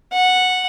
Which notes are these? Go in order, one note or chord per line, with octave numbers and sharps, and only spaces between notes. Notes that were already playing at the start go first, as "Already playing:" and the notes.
F#5